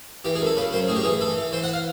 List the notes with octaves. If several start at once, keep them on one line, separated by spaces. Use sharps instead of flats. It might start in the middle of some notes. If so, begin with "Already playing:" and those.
E3 G4
G#4
F#2
A4
C#3 B4
F#2 C5
A2 G#4
G4
E3 G#4
E3 A4
E3
E3 C5
F#5
F5